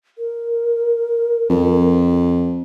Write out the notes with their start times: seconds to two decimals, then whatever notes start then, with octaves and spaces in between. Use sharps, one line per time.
0.18 A#4
1.50 F2